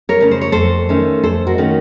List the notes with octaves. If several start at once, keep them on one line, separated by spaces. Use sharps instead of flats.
A#4 C#5
C#3 A3 C#4
C5
C#5
F2 A4 C5
D#3 A3 C#4
F2 A4 C5
F#4 A#4
D#3 A3 C#4